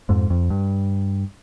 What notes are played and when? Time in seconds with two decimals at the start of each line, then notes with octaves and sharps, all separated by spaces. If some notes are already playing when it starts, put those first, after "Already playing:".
0.09 F2 G#2
0.30 F2
0.50 G2